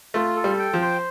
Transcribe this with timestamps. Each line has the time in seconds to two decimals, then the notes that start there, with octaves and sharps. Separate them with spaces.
0.14 A3 F4
0.36 A4
0.44 G3
0.59 G5
0.73 F3
0.82 C5